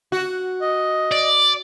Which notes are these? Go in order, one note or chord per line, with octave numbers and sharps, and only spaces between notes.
F#4
D#5
D5